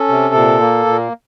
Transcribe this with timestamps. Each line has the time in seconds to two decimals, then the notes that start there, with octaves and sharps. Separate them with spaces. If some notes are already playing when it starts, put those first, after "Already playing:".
Already playing: C#4 A4
0.09 C3
0.35 A#2
0.60 A#3
0.86 A#2